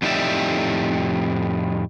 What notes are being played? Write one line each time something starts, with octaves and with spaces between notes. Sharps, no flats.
F2 A2 D#4 G4 D5 E5